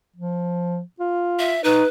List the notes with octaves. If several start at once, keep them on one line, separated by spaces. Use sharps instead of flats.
F3
F4
E5
D#4 B4